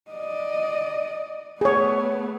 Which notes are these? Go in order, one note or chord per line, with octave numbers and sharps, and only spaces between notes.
D5 D#5
A3 B3 G#4 C#5